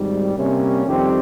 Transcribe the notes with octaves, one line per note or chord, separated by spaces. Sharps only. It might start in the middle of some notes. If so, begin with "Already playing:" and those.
Already playing: G#1 G#2 G3
C3 G3 A#3 C#4
F2 D#3 G3 C4 G4